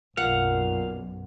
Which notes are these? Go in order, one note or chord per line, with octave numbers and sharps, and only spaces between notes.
B1 F#2 A#2 F5 F#5